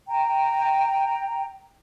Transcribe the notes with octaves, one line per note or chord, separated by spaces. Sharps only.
G5 A#5